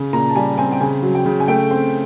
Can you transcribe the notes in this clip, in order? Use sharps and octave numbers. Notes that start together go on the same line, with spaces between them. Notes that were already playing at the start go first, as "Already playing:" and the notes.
Already playing: C#3
A#2 A#5
A5
G3 G#5
C4 G#5
G5
C#3 G#5
F#3
G5
C#3
G#5
A3 G5
C4